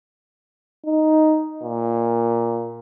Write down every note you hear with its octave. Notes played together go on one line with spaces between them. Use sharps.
D#4
A#2